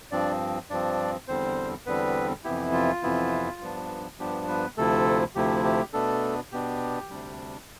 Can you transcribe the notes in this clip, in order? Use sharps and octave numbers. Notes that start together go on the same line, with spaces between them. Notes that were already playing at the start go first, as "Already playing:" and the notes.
G2 F3 C4 D4 D5
G2 F3 C4 D4 D5
E2 D3 G3 C4 C5
E2 D3 G3 B3 C4 B4
F2 C3 E3 B3 E4 G4
F4
F2 C3 E3 B3 E4
G2 F3 B3 D4
G2 F3 B3 D4 G4
B3 B4
D2 C3 F3 A3 E4 A4
D2 C3 F3 A3 E4 G4
G4
B2 A3 B3 D4 A4
B2 B3 D4 G4
D2 C3 G3 D4